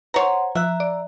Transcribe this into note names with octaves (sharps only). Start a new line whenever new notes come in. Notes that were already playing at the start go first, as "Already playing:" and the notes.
C5 C#5 F#5 A#5 C6
F3 E5 A#5 F#6
D5